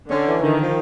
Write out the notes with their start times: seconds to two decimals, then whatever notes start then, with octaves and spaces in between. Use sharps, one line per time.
0.10 D3 C#4
0.26 E3
0.42 D3 D#3
0.60 F3